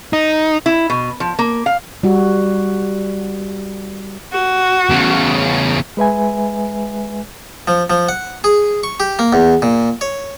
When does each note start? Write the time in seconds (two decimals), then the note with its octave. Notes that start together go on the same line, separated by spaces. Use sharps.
0.13 D#4
0.66 E4
0.90 B2
1.20 F3
1.39 A#3
1.66 F5
2.03 G3 F#4
4.33 F#4
4.90 E2 C#3
5.97 G#3 B4 E5 G#5
7.68 F3
7.90 F3
8.09 F#5
8.44 G#4
8.84 C#6
9.00 G4
9.19 A#3
9.33 E2
9.62 A#2
10.01 C#5